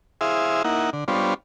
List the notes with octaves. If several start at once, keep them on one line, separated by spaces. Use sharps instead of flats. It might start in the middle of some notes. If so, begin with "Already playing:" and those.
E4 G#4 C5 E5 F5 D#6
A#3 D#4 E4 F#5
D3
G3 B3 D4 F4 C5 C#5